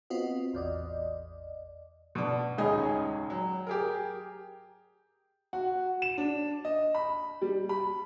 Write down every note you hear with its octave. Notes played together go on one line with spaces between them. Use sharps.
B3 C4 F4 F#4 D#5
A1 E2 D5 D#5
B2 D4
D#1 C#2 D#3 C#4 G#4 D#5
F#3
G4 G#4 A#4
F#4
E7
D4
D#5
B5
G3
B5